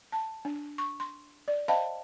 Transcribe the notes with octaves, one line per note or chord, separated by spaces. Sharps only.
A5
D4
C#6
C6
D5
C5 D#5 F5 G5 A5 B5